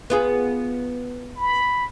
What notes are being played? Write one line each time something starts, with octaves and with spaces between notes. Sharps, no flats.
B3 F4 G#4
B5